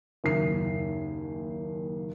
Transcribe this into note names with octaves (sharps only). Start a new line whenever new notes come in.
F#1 D#2 C7